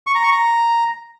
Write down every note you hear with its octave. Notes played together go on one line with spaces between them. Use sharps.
C#6
A#5
C#6
A#5